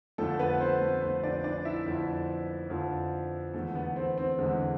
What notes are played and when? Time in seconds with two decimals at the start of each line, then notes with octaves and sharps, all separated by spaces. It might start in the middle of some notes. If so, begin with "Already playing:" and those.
0.18 F2 D3 F3 A3 A4
0.39 B3 B4
0.60 C4 C5
0.81 A3 A4
1.02 F2 D3 F3 C4 C5
1.23 D4 D5
1.44 D4 D5
1.65 E4 E5
1.86 F2 D3 F3
2.70 F2 D3 F3
3.54 E2 D3 G#3 A3 A4
3.75 B3
3.96 C4
4.18 C4
4.39 E2 D3 G#3